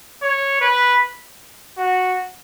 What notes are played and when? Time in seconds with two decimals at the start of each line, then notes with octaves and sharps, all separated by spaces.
0.22 C#5
0.61 B4
1.78 F#4